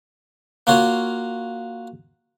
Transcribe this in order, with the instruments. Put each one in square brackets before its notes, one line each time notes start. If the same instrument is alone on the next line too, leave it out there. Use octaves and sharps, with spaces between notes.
[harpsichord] A#3 F4 F#4 C#5